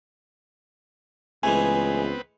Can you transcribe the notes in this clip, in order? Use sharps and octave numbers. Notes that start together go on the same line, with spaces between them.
C#2 E3 G#3 A3 B3 C4 B4 G#5